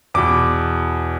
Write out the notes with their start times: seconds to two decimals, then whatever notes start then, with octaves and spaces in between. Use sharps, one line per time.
0.14 E2 B2 D6